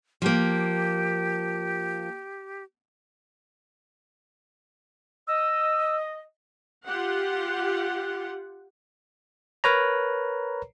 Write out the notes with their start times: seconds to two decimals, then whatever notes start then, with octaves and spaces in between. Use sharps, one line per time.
0.22 F3 A#3 G4
5.28 D#5 E6
6.87 F4 G4 F#5
9.64 A#4 B4 C#5 A#5